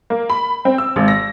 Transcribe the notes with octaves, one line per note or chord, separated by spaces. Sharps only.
A#3
B5
C4
E6
G#1
A#6